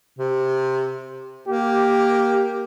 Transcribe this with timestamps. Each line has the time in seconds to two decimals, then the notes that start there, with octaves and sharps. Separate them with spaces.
0.19 C3
1.48 A#3 G4